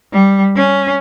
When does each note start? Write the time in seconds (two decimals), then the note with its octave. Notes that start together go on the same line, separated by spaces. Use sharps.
0.13 G3
0.56 C#4